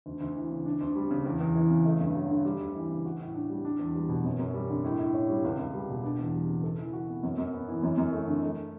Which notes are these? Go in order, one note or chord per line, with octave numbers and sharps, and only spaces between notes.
D2
D2
E3
C#3
D4
D2
G3
C#3
E2
E2
E3
C#3
A3
G2
F#3
D3
G3
D2
E3
C#3
F#4
A2
D4
G3
D4
E2
G3
B2
F#2
F#2
G3
D3
A2
A2
C#4
G3
C#2
C#2
G3
B2
D4
E2
G3
C#3
A4
E3
F#4
B3
F#2
F#2
B3
E3
F#2
F#2
A3
D3
A3